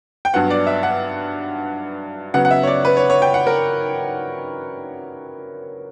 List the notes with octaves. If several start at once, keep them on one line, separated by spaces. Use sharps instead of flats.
G5
G2 F#3 B3 F#5
D5
E5
F#5
C#3 F#3 B3 F#5
F#5
E5
C#5
D5
B4
C#5
C#5
G5
F#5
A#4